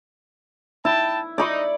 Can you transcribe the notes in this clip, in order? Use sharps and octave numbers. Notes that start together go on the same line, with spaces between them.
E4 G5 A5
D#4 D5 B5 C#6